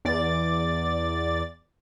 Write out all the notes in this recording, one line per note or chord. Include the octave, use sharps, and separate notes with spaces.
E2 D5 A6